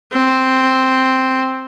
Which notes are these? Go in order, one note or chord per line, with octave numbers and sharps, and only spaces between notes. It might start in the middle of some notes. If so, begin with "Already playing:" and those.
C4